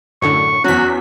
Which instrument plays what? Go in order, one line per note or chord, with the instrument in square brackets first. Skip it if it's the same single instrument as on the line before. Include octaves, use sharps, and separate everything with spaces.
[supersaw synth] F#2 A2 D3 [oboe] C#6
[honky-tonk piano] E2 F#3 [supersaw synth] C#4 B6 [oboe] F#4